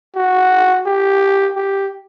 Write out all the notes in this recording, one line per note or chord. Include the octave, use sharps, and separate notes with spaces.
F#4
G4
G4